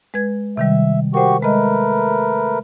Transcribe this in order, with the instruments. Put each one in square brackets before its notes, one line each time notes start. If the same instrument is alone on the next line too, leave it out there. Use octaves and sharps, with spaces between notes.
[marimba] G#3 B4 G#6
[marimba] C3 D#3 G3 [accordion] E5
[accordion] F#4 G4 C#6 [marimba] A#4 C5
[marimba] G#3 D#5 [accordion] A3 A#4 B4